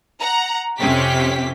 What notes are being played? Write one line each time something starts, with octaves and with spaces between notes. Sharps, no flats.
F#5 A#5
F2 C3 C4 C#4 G4 B6